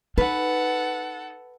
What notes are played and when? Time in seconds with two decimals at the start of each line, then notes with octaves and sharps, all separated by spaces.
0.18 D#4 A4 B4 F#5